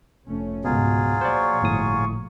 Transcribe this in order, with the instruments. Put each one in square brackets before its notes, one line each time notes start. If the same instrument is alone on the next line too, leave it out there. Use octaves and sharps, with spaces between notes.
[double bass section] F1 A3 C#4
[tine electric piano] C#2 B2 [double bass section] G#2 [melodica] F#3 F4 G#4
[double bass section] A#1 A#2 F3 [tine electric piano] C5 D5 [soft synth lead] C#6
[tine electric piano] G1 A2 D#6